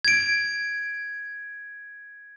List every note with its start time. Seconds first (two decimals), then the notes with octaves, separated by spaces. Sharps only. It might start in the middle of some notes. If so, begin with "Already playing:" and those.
0.05 G#6 D7